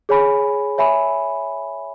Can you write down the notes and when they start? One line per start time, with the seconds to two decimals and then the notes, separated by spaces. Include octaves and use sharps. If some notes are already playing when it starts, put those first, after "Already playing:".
0.09 G#4 C#5 G#5 B5
0.78 C#5 E5 G#5 B5